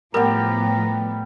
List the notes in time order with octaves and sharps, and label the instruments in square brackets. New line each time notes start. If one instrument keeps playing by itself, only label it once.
[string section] A2 F3 B3 [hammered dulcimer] G3 G4 [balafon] A#4 [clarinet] A#5